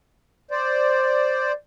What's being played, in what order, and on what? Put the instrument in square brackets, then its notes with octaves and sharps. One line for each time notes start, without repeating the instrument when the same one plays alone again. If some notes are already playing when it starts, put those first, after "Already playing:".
[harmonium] C5 D5